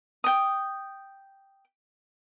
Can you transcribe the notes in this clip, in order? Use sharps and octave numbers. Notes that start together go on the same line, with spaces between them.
G5 D#6